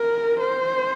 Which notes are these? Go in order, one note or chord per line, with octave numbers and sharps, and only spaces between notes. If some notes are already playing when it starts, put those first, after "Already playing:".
Already playing: A#4
C5